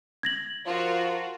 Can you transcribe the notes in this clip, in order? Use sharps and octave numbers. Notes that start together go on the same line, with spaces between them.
G#6 A#6 F#7
F3 F4 F#4 A#4